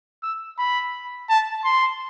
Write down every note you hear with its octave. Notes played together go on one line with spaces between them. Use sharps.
E6
B5
A5
C6